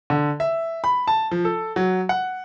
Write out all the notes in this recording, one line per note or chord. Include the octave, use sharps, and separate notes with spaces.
D3
E5
B5
A5
F3
A4
F#3
F#5